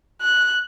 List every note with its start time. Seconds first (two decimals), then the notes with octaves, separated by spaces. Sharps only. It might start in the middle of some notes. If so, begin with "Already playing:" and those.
0.21 F#6